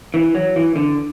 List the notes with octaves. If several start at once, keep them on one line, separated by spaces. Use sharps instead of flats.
E3
F#3
E3
D3